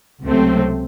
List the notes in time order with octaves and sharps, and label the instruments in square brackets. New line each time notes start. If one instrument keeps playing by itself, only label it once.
[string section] C#2 C3 F#3 A3 C4